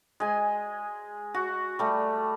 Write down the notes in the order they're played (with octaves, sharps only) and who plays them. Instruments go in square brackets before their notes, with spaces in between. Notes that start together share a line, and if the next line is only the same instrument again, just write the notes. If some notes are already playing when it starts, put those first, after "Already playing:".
[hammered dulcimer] G#3 G#5
F#4
G3 A3